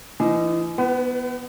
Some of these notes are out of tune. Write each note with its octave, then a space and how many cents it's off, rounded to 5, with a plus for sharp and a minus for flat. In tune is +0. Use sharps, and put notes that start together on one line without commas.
E3 +35 D#4 +0
B3 -5 B4 +35 F#5 +35